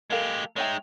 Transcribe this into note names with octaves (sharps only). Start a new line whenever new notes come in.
G#3 G4 A4 A#4 F5
G#3 D#4 C#5 E5 G5